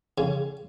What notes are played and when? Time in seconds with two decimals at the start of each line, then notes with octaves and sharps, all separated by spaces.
0.18 C#3